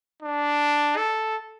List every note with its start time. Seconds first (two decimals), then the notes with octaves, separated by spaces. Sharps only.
0.23 D4
0.97 A4